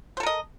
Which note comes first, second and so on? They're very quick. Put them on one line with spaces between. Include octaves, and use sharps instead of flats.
C5 A4 A#4 D#5